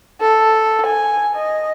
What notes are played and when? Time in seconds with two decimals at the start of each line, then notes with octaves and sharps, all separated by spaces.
0.21 A4
0.87 G#5
1.36 D#5